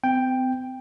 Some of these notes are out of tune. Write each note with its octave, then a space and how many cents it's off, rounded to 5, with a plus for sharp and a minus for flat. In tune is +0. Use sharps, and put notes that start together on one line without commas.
C4 -40 G5 +5